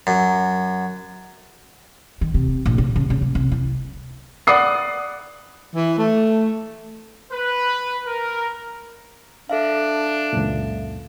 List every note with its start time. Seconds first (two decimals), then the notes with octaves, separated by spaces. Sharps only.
0.07 F#2
2.21 D#3
2.34 C3
2.66 A#1
2.78 D#4
2.96 C#3
3.10 C#3
3.22 A#3
3.35 C2
3.51 E4
4.47 D5 F#5 B5 D#6 C7
5.75 E3
5.98 A3
7.31 B4
8.06 A#4
9.49 D4 A4 E5 F5
10.33 C#2 F#2 A#2